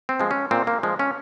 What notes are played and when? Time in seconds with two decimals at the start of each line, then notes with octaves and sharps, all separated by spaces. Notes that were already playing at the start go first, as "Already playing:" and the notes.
0.09 C4
0.20 F3 G#3
0.31 C#4
0.51 A#2 C4
0.67 A#3
0.83 F3 G#3
0.99 C#4